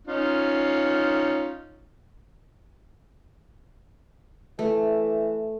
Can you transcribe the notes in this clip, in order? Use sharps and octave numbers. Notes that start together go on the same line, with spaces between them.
C#4 D#4 F4
E3 A3